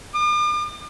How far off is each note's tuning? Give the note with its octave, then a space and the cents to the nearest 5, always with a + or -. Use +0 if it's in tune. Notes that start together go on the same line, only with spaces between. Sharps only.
D6 +45